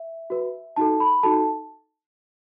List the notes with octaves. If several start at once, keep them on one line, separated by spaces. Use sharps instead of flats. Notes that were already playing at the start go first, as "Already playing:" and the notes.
Already playing: E5
F#4 B4
D#4 F#4 A4 A5
B5
D#4 F#4 A4 A5